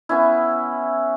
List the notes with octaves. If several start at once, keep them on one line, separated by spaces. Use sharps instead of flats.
B3 C#4 E4